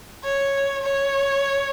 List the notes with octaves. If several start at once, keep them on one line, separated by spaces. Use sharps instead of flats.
C#5
C#5